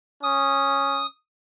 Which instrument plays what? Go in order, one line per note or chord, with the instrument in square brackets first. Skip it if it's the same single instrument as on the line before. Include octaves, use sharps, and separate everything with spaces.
[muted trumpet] C#4 [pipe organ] D#6